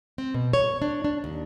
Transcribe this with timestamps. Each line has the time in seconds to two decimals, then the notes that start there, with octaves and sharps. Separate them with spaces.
0.18 C4
0.34 B2
0.53 C#5
0.82 D4
1.04 D4
1.24 D#2